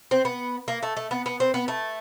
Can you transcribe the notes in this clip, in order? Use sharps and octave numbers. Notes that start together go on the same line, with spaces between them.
C4
B3
A#3
A3
A3
B3
B3
C4
B3
A3